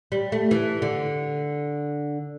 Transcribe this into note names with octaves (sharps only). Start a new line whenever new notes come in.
G3
A3
E3
D3